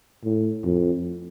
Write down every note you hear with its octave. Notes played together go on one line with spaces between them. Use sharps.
A2
F2